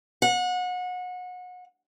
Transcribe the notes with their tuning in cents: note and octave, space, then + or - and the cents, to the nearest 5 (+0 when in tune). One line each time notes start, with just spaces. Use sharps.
F#5 -30